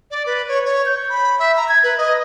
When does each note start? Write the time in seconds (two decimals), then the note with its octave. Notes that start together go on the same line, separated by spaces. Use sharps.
0.11 D5
0.26 B4
0.48 C#5
0.65 C#5
0.86 G6
1.09 B5
1.39 E5
1.57 A#5
1.69 G#6
1.84 B4
1.98 D#5